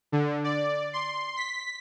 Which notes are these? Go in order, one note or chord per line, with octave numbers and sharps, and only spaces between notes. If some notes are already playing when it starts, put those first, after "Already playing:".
D3
D5
C6
B6